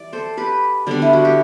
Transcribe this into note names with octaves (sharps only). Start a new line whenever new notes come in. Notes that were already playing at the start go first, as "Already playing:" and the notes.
Already playing: E3 G3 D5
A4 C5
G4 B4
D3 G3 B3 D4
E4
F#4
G4